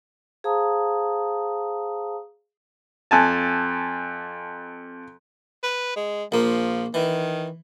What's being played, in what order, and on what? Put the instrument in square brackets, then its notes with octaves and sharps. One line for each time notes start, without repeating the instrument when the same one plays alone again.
[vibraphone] G#4 C5 F5 A5 A#5 D#6
[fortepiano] F2 G#5 A5
[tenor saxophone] B4
G#3
[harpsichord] A#1 A#3 [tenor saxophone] F3
[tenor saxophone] D#3 [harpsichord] E3